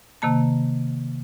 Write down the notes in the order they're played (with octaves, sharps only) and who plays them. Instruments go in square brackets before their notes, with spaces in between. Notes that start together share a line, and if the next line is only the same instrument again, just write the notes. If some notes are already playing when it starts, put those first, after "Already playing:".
[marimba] C3 D#3 A#3 A5